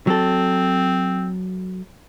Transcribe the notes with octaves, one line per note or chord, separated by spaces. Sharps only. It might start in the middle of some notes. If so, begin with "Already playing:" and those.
F#3 C4 A4